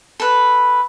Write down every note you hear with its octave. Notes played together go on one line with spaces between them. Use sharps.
A4 B4